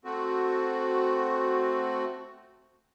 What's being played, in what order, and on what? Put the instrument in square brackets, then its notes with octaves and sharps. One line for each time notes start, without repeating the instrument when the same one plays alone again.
[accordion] A3 C4 F#4